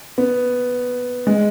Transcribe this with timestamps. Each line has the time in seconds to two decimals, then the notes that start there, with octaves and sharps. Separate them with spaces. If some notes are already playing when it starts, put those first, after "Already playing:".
0.18 B3
1.27 G#3